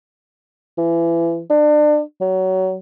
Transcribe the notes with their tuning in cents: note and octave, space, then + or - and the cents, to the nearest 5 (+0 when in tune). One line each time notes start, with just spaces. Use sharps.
E3 +30
D4 +30
F#3 +20